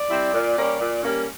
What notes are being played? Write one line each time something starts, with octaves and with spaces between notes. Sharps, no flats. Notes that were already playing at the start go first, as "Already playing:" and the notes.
Already playing: D5
G3 C4 E4
A#2
G3 A#3 C#4
A#2
G3 A#3 C#4